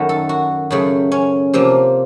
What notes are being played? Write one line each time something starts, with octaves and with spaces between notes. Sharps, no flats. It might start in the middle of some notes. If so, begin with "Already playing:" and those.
Already playing: F#2 D#3 A3 F#4
A4
F#4
F#2 C#3 A3
C#4
C3 F3 A#3